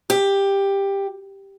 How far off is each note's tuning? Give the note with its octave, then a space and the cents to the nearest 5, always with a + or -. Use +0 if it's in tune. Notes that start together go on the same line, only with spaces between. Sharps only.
G4 +10